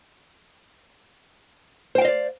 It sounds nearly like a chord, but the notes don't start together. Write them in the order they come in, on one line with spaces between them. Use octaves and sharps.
C5 G5 F5 D#5 D5